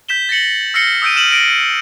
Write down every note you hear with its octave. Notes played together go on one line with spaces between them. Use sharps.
G6 B6 E7 G7
A6 A#6 C#7 F#7
E6 F6 A#6 C7 C#7 G7
D#6 E6 G6 D7 D#7
F6 E7 F#7
A#6 D7 F#7